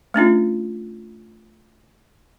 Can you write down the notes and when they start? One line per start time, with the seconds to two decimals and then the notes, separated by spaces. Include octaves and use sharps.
0.14 A3 C#4 D4 F4